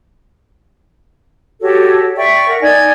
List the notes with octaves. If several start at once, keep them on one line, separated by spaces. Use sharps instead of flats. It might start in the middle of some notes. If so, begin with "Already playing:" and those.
F#4 G4 A4 C#5
D5 E5 G5 C#6
A#4 F#5
D#4 D5 G#5 G#6